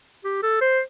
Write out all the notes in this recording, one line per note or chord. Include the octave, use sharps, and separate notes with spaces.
G4
A4
C5